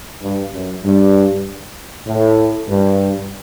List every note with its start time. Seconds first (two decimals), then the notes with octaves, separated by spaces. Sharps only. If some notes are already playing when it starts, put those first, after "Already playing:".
0.22 G2
0.53 F#2
0.84 G2
2.07 A2
2.68 G2